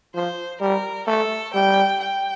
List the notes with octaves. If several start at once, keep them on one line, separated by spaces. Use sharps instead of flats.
F3 C5
G3 A#4
A3 A4
G3 G5
G5